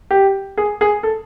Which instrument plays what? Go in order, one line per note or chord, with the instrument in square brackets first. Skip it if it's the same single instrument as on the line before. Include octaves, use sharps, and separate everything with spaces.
[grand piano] G4
G#4
G#4
A4